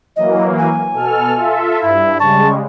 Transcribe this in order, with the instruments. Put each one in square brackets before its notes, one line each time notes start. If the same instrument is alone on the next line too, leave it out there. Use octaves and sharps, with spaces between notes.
[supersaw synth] E3 F#3 A#3 [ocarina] D#5
[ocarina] G#5
[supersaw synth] B2 A4 F6
F4 A4 E5
[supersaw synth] G2 [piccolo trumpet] E4 [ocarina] E5
[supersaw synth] C#3 G3 G#3 [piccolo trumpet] A5 [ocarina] C#6